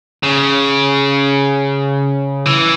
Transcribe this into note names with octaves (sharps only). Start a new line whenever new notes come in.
C#3
E3